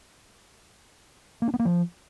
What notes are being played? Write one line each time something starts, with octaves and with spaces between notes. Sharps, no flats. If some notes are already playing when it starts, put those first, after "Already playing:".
A#3
D4
B3
A#3
F3